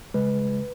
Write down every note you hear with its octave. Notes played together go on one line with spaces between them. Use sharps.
C#3 G#3 B4